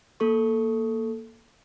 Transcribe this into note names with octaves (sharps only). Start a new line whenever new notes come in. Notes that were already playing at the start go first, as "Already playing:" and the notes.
A#3 A4 C#6